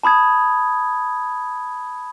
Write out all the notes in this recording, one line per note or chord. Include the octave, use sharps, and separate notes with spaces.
A5 B5 D#6 G#6